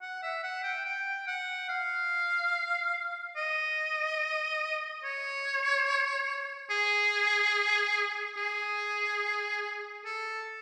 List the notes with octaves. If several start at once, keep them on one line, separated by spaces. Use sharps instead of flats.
F#5
E5
F#5
G5
G5
F#5
F5
D#5
C#5
G#4
G#4
A4